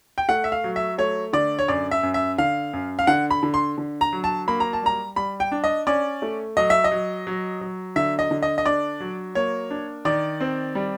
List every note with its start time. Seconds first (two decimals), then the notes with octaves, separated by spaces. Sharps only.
0.18 G5
0.29 A3 F#5
0.44 E5
0.52 F5
0.64 F#3
0.76 E5
0.98 A3 C#5
1.33 D3 D5
1.59 C#5
1.68 F#2 D5
1.91 E5
2.03 F#2
2.14 E5
2.38 D3 F5
2.73 F#2
2.99 F5
3.07 D3 F#5
3.31 B5
3.43 D3
3.54 C6
3.78 D3
4.01 A#5
4.13 F#3
4.24 A5
4.48 A#3 B5
4.60 A#5
4.73 A5
4.83 G3 A#5
5.16 G3 B5
5.40 G5
5.52 D4
5.64 D#5
5.87 C#4 D5
6.22 A3
6.57 F#3 D#5
6.70 E5
6.84 D#5
6.92 F#3
7.27 F#3
7.61 F#3
7.96 D3 E5
8.19 D#5
8.31 D3
8.43 D#5
8.58 D#5
8.66 D4 D5
9.00 F#3
9.35 A#3 C#5
9.70 D4
10.05 D#3 D5
10.41 C4
10.75 G3